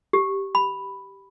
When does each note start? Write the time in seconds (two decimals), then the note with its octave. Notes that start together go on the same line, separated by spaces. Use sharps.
0.13 G4
0.55 B5